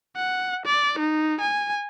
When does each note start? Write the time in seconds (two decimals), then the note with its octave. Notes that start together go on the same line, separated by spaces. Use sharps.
0.16 F#5
0.66 D5
0.99 D#4
1.41 G#5